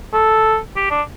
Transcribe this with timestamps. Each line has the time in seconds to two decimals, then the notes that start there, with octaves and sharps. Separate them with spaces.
0.13 A4
0.76 G4
0.91 D4